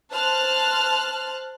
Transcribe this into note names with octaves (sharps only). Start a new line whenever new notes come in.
C5 A5 F6 F#6